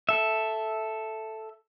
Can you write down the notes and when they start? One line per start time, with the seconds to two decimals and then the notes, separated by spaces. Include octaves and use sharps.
0.09 A4 E5